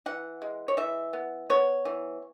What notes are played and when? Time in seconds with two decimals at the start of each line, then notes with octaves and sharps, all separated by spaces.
0.06 E3 F#5
0.42 G#3
0.68 C#5
0.77 E3 E5
1.13 B3
1.50 B3 C#5
1.85 E3